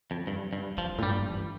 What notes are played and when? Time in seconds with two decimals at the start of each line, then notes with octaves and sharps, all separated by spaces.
0.11 F2
0.27 G2
0.53 G2
0.77 F2 F3
0.98 A2
1.02 G2 G3
1.18 F3
1.28 E3